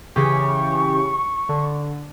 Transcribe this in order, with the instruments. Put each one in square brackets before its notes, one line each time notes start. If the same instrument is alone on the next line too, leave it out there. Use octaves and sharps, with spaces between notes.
[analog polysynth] C#3 E3 G4 [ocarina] C#6
[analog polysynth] D3